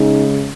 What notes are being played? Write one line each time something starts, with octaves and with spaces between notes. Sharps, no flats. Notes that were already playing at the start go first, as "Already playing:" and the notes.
Already playing: C#3 G#3 D#4